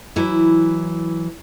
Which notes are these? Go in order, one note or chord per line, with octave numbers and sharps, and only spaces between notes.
E3 F#3 E4